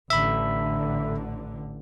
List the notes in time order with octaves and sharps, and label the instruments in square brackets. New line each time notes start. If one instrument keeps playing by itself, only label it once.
[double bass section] A1 D3 [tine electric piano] E5 B5